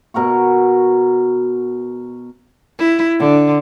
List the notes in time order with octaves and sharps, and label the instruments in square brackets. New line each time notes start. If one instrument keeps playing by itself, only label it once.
[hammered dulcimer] B2 A#4 F#5 C#6
[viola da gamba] E4
D3